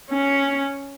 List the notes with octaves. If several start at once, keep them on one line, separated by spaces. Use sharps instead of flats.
C#4